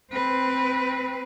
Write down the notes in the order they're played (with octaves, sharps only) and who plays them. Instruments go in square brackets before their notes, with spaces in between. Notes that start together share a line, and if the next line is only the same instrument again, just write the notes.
[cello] C4 B4